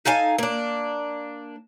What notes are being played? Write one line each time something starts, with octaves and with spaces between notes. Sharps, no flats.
D#4 A4 F5 G#5
A#3 D4